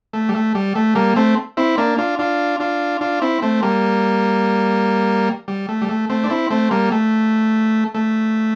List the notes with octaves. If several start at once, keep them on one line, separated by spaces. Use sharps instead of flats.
A3
G3
A3
G3
A3
G3 A#3
A3 C4
C4 E4
A#3 D4
D4 F4
D4 F4
D4 F4
D4 F4
C4 E4
A3 C4
G3 A#3
G3
A3
G3
A3
A3 C4
D4
C4 E4
A3 C4
G3 A#3
A3
A3